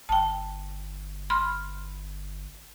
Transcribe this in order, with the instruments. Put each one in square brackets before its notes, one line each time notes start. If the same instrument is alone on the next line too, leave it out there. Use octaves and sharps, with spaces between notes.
[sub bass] G1 [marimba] G5 A5
[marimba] B5 C6 F6